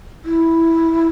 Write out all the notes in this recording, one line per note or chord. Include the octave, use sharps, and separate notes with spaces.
E4